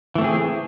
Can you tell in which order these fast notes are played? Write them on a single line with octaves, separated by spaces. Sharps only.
E3 A3 C4 G#4